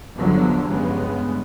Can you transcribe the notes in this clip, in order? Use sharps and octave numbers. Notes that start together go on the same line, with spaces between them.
G1 E2 D3 F3 F#3
G2 C#3 G#3 B3